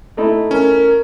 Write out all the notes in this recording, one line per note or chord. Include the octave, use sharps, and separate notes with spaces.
A3 D#4 E4
C#4 A#4